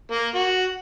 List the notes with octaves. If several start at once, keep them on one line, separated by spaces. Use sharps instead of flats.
A#3
F#4